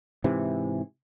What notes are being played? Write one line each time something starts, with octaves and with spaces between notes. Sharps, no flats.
G#2 C3 E3